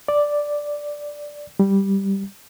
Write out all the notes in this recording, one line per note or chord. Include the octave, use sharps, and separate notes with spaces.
D5
G3